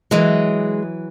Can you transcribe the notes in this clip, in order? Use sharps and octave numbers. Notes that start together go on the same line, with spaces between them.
E3 F#3 G#3